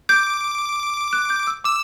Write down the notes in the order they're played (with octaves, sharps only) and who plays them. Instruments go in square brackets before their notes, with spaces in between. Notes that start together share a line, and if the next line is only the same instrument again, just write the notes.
[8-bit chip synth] D6 [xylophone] G6
[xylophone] F#6
G6
E6
[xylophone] D6 [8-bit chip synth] E6